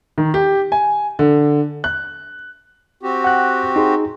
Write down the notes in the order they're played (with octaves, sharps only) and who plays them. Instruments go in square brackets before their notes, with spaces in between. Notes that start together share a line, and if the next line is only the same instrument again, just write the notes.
[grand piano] D#3
G4
G#5
D3
F#6
[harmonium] C4 F#4 G4
[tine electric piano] F#5 F#6
D#4 G#4 C6